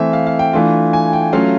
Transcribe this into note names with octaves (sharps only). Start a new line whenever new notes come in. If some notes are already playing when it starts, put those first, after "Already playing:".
Already playing: E3 A3 C4 E5
F5
F5
G5
E3 A3 D4 F4
G#5
G5
F#3 A3 C#4 F4 F5